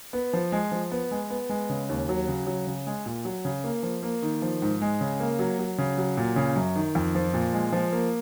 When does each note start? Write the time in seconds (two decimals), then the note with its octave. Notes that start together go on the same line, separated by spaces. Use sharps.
0.13 B3
0.33 F3
0.52 G#3
0.72 F3
0.92 B3
1.11 G#3
1.30 B3
1.49 G#3
1.69 C#3
1.89 D#2
2.09 F#3
2.28 C#3
2.47 F#3
2.67 C#3
2.87 G#3
3.06 A#2
3.25 F#3
3.45 C#3
3.64 A#3
3.83 F3
4.03 A#3
4.22 D#3
4.42 F3
4.62 G#2
4.82 G#3
5.01 C#3
5.20 A#3
5.39 F#3
5.59 F#3
5.78 C#3
5.97 F#3
6.17 A#2
6.36 C#3
6.56 F#2
6.76 D#3
6.95 F2
7.15 F3
7.33 A#2
7.53 G#3
7.72 F3
7.93 A#3